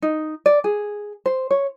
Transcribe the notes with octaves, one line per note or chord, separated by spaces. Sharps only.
D#4
D5
G#4
C5
C#5